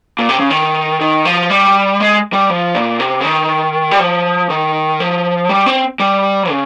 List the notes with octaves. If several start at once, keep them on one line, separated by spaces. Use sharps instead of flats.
A#2
C3
C#3
D#3
D#3
F3
G3
G#3
G3
F3
A#2
C3
C#3
D#3
G3
F3
D#3
F3
G3
C4
G3
C#3